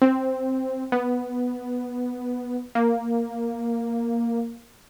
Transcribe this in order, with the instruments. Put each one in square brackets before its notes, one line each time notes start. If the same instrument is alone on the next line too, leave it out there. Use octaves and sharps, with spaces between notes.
[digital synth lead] C4
B3
A#3